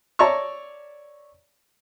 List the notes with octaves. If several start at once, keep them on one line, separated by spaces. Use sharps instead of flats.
C#5 D5 E5 A5 A#5 C#6